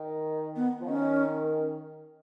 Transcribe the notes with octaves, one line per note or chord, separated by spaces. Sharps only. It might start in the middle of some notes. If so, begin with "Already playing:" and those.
Already playing: D#3
B3
F3
D#3 C#4